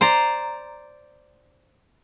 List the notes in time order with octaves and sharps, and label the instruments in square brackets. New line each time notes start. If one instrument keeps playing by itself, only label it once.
[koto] C5 D5 A#5